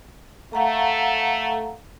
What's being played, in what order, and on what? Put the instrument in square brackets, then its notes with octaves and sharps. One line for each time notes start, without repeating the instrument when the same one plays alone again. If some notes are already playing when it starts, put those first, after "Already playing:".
[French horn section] A3 [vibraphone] F5 F#5 A#5